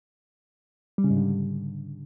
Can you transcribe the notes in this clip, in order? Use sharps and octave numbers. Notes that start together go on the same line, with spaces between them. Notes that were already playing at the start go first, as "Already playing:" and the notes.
G3
C#3
G#2
D3